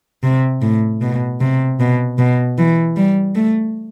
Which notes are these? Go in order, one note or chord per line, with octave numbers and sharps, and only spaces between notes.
C3
A2
B2
C3
B2
B2
E3
G3
A3